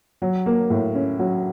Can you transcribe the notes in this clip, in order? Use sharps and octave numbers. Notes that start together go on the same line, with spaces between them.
F#3
A#3
A2
C#4
F#3